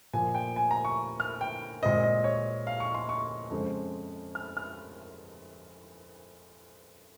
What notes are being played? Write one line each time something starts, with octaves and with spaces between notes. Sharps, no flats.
A#2 F3 A#3 G#5
G5
G#5
A#5
C#6
F6
G5
A#2 G#3 C4 D#5
D#5
C#5
F5
C#6
C6
C#6
F2 C#3 G#3 C4
F6
F6